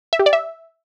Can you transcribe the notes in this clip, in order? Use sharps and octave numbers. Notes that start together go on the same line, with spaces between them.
E5
G4
D5
E5